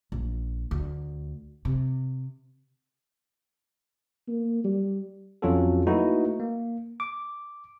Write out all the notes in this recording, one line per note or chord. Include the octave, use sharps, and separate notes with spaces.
A#1
D2
C3
A#3
G3
F2 F#3 C#4 F4 F#4 A4
A3 A#3 D#4 E4 F#4 B4
A#3
D6